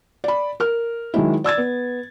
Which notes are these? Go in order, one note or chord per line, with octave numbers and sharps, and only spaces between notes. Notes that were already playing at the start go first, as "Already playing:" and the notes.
D5 B5
A#4 F6
D#3 F#3 G#3 D#4 E4
D5 E6 G#6 A6
B3